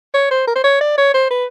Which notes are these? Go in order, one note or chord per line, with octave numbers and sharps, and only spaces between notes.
C#5
C5
A#4
C5
C#5
D5
C#5
C5
B4